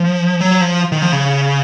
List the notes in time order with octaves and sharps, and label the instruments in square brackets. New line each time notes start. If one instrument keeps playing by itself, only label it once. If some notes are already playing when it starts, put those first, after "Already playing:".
Already playing: [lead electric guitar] F3
F#3
F3
D#3
F3
C#3